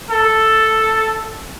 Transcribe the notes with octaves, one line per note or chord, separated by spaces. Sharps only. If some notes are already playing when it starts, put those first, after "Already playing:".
A4